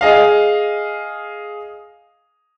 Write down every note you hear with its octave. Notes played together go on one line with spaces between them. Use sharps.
G#4 D#5 F5